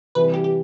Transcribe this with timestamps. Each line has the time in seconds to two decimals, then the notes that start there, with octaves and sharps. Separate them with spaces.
0.15 C3 E3 G3 B4
0.34 G4
0.44 G4